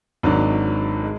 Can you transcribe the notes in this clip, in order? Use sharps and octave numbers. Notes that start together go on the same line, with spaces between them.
G#1 G#2 F#3 D4
G#3